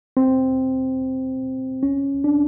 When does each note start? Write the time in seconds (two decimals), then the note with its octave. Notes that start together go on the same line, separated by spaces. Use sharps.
0.17 C4
1.83 C#4
2.24 D4